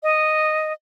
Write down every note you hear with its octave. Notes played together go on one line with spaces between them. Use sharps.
D#5